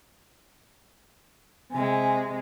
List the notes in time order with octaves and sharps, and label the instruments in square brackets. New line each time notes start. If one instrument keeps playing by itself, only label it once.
[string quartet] C3 G#3 [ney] G#5